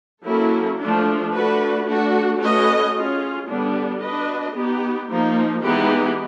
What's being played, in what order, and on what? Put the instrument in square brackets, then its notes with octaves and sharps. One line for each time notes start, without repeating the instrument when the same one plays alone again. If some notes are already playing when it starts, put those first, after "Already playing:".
[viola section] F#3 A#3 C#4 E4 A4
F3 A3 D4
A3 D4 F#4 B4
A3 D4 F#4
A3 C#4 F#4 B4 D#5
C#4 F4 G#4
D3 G3 B3 D4
D4 F#4 B4 D#5
B3 D#4 G4
F3 A#3 D#4
E3 G#3 B3 D#4 G4